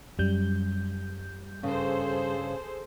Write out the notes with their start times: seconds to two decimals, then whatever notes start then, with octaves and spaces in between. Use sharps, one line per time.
0.19 F#2 G3 G6
1.63 G2 C#3 C#4 G#4 A4 C5